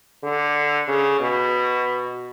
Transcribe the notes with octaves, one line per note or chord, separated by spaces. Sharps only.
D3
C#3
B2